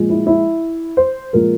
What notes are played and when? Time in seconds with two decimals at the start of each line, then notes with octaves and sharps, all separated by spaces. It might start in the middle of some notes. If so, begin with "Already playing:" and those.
Already playing: A#2 F3 G#3
0.10 E4
0.27 E4
0.97 C5
1.33 A#2 F3 G#3 A#4